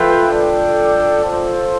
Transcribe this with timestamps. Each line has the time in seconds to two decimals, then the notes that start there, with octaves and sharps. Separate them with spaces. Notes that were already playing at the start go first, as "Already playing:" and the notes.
Already playing: F3 A3 F4 B4 E5 G5
0.28 D4 A4 D5 G5
1.23 F4 A4 C5